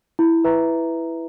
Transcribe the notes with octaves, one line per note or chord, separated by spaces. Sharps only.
E4
B4 E5 A#5